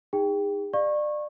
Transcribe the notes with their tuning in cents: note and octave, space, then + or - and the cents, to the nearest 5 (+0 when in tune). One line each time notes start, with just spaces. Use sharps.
D#4 +0 G#4 -35 G5 +0
D5 +25 F5 +0 C#6 -20